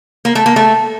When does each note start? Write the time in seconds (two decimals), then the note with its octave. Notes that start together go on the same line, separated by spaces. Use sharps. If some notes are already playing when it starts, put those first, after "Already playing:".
0.25 A#3
0.35 A3
0.46 A#3
0.56 A3